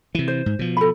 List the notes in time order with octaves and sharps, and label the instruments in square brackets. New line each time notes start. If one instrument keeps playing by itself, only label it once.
[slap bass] C3 E3
[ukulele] C5
[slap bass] G#2
B2 F3
[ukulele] A4 B5